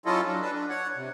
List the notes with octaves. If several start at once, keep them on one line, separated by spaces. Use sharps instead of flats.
F#3 C#4 E4 F4 A4 D#5
F#3 D4
D4 A4 B4
D4
C#5 F#5
C3